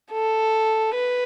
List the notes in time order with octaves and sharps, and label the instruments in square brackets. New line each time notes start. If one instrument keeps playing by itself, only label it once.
[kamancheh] A4
B4